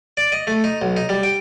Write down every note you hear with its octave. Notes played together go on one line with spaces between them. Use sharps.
D5
D#5
A3
D#4
B1
D#4
G3
G5